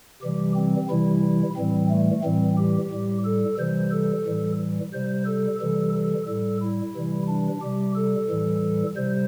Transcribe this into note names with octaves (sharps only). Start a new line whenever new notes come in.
C3 E3 G3 G4
C4
C3 E3 G3 E4
A2 E3 G3 C4
A3
A2 E3 G3 C4
G4
A2 G3
A4
C3 E3 G3 C5
A4
A2 E3 G3
C3 G3 C5
A4
C3 E3 G3 A4
A4
A2 G3 A4
E4
C3 E3 G3
D4
C3 G3 G4
A4
A2 E3 G3
C3 G3 C5